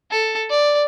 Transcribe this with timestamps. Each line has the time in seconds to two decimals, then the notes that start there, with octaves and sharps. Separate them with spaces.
0.11 A4
0.50 D5